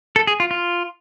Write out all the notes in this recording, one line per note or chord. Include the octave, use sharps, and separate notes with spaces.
A4
G#4
F4
F4